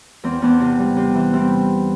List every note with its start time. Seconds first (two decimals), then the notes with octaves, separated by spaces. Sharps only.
0.24 E2 C4
0.42 E2 B3 D4
0.60 C3
0.79 G3
0.96 C3
1.15 E3
1.33 G3 C4 E4